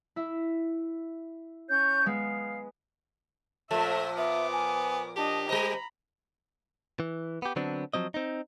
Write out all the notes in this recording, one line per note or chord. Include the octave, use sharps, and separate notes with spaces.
E4 E5
C#4 C#5 G6
G#3 B3 F5
A#2 F3 A3 E5
B3 E5 D6
G#5
D4 G4 D#5 A5
G3 C5 D#5 A#5 B5
E3
B3 G4
D3 F#3 B3 C4 D4
F3 F#3 C4 D#5
C4 D#4